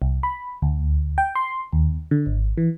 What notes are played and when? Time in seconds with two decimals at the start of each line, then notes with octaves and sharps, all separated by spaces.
0.02 C2
0.23 B5
0.62 D2
1.18 G5
1.35 C6
1.73 D#2
2.11 D3
2.26 G#1
2.58 E3